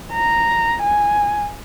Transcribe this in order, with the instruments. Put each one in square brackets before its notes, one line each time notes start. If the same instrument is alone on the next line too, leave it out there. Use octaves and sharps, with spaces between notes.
[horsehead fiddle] A#5
G#5